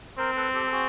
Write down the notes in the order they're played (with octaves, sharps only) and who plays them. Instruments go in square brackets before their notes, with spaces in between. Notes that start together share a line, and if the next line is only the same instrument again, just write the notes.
[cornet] C4 [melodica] A#4 C5
[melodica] A4 B4
G4 A4
A4
F#4 G#4